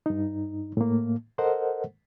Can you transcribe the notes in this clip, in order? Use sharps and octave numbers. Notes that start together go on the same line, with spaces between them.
G2 D#4
A2 A#3
A4 A#4 C5 D#5 F#5